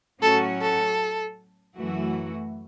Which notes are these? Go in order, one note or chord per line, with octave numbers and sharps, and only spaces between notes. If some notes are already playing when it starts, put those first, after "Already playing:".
A2 F#3 C#4 F#4 A4
A4
F#2 E3 A3 F#4